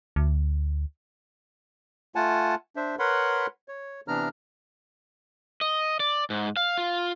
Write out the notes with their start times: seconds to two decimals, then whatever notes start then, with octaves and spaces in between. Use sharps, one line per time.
0.16 D2
2.15 A3 F4 F#5 G#5 A5
2.76 D4 C5 E5
2.99 A#4 B4 C#5 F#5 B5 C6
3.68 C#5
4.08 C3 E3 B3 D4 A#5 F6
5.61 D#5
6.00 D5
6.30 G#2
6.57 F5
6.78 F4